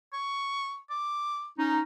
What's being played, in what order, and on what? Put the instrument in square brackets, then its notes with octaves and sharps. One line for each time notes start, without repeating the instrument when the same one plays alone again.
[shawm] C#6
D6
[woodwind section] C#4 D#4